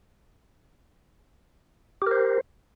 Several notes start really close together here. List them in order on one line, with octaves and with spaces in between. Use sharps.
G4 A#4 C5